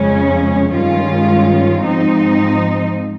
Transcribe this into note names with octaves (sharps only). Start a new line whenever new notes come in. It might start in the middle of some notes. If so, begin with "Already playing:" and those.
Already playing: F2 C#3 G#3 C#4
G2 D#3 G#3 C#4 F4
G#2 F3 C4 D#4